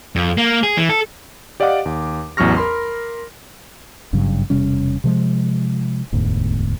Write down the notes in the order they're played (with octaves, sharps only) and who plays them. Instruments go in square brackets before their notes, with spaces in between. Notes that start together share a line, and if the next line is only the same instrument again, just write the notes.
[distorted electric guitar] F2
A#3
G#4
E3
A4
[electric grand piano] G4 D5 D#5 F5 F#5 D6
D#2
A1 E2 F#3 C#6 F6 A#6
A#4 B5 C6
[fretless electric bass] G#1 G2 C#3 F#3
E1 C3 G3 C#4
C3 F3 G#3
E1 D2 G#2 B3